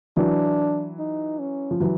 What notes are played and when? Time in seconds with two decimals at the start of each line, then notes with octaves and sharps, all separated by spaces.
0.16 E3 F#3 D4
0.99 D#4
1.39 C#4
1.71 F3
1.80 E3 F#3